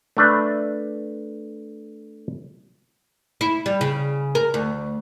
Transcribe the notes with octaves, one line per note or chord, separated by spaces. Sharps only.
A3 D4 B4
E4
G3
C#3
A#4
D2